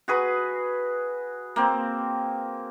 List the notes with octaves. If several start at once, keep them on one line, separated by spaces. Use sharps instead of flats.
F#4 G#4 B4
A#3 C4